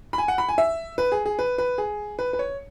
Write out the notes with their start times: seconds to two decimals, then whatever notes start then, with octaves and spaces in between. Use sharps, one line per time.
0.13 B5
0.18 G#5
0.28 F#5
0.38 B5
0.48 G#5
0.58 E5
0.98 B4
1.12 G#4
1.26 G#4
1.39 B4
1.58 B4
1.78 G#4
2.19 B4
2.33 B4
2.39 C#5